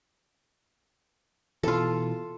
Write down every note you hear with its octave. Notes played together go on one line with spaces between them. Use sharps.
B2 E3 F4 A4